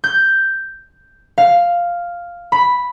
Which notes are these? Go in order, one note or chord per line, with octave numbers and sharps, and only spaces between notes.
G6
F5
B5